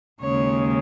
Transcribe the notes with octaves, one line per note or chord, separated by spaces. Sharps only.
D#2 C#3 G#3 C#5